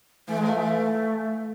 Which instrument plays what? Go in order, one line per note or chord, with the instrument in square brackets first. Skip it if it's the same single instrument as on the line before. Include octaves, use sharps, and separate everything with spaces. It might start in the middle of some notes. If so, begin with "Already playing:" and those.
[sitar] E3 [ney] A3
[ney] G#3
[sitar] F3 [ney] A3
[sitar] E3